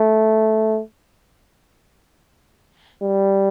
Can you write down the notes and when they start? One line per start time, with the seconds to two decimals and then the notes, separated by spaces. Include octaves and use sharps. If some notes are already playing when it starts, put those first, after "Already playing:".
Already playing: A3
3.02 G3